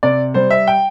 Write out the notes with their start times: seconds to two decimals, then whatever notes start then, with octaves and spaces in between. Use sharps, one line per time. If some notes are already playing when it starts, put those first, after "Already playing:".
0.03 C3 D5
0.34 G3 C5
0.50 E5
0.67 G5